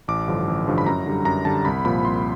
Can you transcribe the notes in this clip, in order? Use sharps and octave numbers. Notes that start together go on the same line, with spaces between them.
A1 D6
G2 D3 F3
A1
G2 D3 F3
B5
F#2 A#5
D3 G3
F#2 A#5
D3 G3 A5
C2 B5
A#2 F3 B5
C2 C6